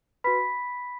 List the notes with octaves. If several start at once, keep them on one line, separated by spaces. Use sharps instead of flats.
F#4 B4 B5 B6